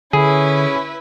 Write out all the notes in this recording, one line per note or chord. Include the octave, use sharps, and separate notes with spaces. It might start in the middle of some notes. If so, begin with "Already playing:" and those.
D3 C#4 E4 G#4 B4